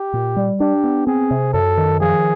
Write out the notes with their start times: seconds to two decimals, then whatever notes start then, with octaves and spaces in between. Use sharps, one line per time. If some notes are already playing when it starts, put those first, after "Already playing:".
Already playing: G4
0.14 A#2
0.36 G3
0.60 D4 G4
0.84 B3
1.07 C4 G#4
1.31 C3
1.53 F#2 A4
1.78 D#3
2.00 F3 G#4